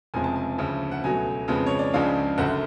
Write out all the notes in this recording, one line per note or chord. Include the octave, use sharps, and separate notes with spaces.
F1 F2 C#3 F3 G#3 G#5
A5
G#5
D2 C#3 F3
F#5
C#2 B2 F#3 A3 G#5
F2 C#3 F3 G#3 B3
C#5
D5
C#2 C#3 F3 G#3 D4 F5
F#1 F#2 D3 F#5